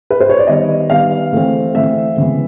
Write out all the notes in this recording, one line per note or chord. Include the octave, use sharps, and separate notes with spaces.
B4
C5
C#5
D5
D#3 G3 B3 D#5
D#3 G3 B3 F5
E3 A3 C4
E3 A3 C4 E5
C#3 E3 G#3 B3